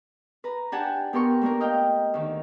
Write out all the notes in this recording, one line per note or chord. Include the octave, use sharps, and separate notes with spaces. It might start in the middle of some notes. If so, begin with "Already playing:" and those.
B4 A#5
D4 G4 F#5 G#5 A5
B3 G4 A#4 C6 C#6
A3 A#3 D4 A#4
D#5 F5 G5
D2 D#3